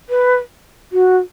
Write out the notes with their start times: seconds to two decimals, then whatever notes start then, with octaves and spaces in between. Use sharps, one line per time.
0.09 B4
0.92 F#4